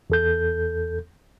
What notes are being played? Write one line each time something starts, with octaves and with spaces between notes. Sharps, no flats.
E2 A4 G6